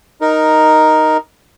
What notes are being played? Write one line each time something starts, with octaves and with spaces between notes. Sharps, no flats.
D#4 A#4